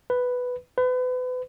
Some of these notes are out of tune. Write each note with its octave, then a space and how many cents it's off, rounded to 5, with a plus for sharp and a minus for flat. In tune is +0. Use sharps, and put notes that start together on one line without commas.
B4 +5
B4 +35